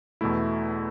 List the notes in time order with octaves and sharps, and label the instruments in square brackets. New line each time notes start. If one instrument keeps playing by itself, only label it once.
[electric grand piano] E2 B2 A3 E4